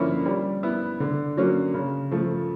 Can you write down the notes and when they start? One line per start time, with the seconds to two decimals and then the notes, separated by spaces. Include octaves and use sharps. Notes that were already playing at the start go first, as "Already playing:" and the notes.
Already playing: D3 F3 A#3 C#4 E4
0.26 G3
0.63 B3 E4
1.00 D3
1.37 F#3 A#3 C#4
1.74 C#3
2.11 F3 A3